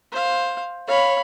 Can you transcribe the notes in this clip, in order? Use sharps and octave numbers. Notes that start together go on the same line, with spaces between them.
C5 F5
C#5 F5 B5